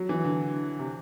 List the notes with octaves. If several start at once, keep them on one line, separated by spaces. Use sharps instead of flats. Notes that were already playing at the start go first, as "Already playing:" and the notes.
Already playing: F#3
E3
D3
C3